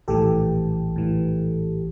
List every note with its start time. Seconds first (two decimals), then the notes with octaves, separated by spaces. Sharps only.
0.08 A#1 A2 E3 G4 A4
0.95 A#1 A2 E3